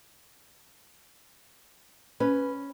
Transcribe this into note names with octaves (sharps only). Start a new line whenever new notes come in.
C#4 B4